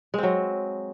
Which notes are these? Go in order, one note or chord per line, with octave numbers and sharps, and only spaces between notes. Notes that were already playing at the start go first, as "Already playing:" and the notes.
F#3 G#3 C4